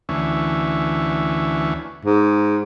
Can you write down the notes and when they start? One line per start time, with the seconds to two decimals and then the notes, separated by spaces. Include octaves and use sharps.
0.09 D2 E3 C#4
2.05 G#2